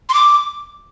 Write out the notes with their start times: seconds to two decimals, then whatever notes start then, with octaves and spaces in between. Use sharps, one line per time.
0.09 C6
0.14 D6